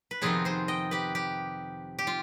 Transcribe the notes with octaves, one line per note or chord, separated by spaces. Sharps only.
B4
F2 C3 D#3 B3 D#4 F4 G#4
G#4 C5
D#5 G5
G4 B4
G4
G4
F4